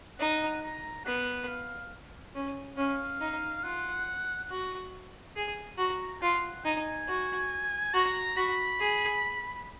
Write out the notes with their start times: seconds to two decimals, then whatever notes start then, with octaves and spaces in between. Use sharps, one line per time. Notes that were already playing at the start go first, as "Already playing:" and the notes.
0.19 D#4 F#5
0.62 A#5
1.05 B3 F#5
1.48 F5
2.35 C#4
2.77 C#4 F5
3.21 D#4
3.63 F4 F#5
4.50 F#4
5.36 G#4
5.78 F#4 A#5
6.21 F4 F#5
6.65 D#4 G#5
7.08 F#4
7.94 F#4 A#5
8.36 F#4 B5
8.80 G#4